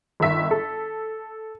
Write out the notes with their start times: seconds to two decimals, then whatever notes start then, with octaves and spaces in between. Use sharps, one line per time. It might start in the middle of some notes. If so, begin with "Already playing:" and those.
0.20 G1 D#3 E5 B6
0.51 A4